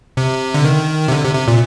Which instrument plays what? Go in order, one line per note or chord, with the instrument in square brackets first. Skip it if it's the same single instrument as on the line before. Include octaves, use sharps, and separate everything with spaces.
[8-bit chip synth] C3
D3
D#3
C3
D3
C3
C3
A#2